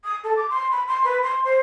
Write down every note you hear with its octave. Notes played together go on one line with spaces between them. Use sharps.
D#6
A4
D6
C6
B5
C6
B4
C6
C5